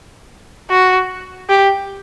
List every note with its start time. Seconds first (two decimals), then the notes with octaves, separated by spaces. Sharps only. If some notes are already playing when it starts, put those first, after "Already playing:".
0.70 F#4
1.50 G4